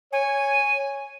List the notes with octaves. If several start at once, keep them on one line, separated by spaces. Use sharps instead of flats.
C#5 G#5